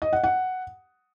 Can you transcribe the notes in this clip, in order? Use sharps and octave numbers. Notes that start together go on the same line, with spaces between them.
D#5
F#5
F#5